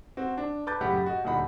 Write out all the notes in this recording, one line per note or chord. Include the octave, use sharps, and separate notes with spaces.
C4 F#4
D4
B4 A5 D6 G6 A6
F#2 A2 C#3 G4 F#5 B5
F#4 D#5
D#1 D2 D#4 F#5 B5